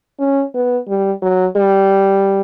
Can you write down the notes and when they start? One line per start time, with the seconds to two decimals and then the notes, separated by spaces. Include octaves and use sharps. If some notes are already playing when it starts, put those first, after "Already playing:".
0.19 C#4
0.54 B3
0.88 G3
1.22 F#3
1.56 G3